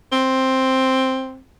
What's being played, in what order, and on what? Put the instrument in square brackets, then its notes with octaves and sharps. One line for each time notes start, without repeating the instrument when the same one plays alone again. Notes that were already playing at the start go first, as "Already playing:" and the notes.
[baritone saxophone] C4